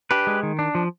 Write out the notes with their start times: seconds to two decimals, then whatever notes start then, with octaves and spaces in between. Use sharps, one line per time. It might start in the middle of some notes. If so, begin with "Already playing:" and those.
0.11 D4 G4 B4
0.27 G#3
0.43 D#3
0.59 D4
0.75 F3